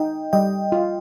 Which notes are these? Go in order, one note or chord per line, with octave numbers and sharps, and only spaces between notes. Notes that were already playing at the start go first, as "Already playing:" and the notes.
Already playing: D#4 D#5 G5
G3 D#5 G5
F4